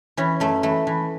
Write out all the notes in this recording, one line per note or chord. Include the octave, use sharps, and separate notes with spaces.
E3 C#4
F#2 A3
E3 A3
E3